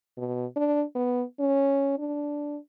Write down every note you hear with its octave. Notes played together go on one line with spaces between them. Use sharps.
B2
D4
B3
C#4
D4